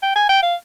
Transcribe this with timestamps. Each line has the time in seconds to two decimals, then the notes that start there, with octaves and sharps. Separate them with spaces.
0.03 G5
0.16 G#5
0.29 G5
0.43 F5